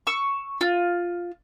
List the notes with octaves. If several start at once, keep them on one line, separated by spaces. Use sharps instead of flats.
C#6 E6
F4